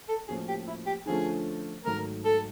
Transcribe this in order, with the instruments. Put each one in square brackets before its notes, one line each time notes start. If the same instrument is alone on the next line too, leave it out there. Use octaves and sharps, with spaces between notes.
[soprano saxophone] A4
[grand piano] A2 F3 A#3 C#4 F#4 [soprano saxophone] G#4
[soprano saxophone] G4
E4
G4
[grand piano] D3 F3 A3 C#4 F4 [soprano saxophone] G#4
[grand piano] G#2 D#3 F#3 A3 [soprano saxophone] A#4
[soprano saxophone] A4